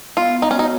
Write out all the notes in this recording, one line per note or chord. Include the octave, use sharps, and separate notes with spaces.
B3 F4
D#4
C#4
D#4 F#4 C#5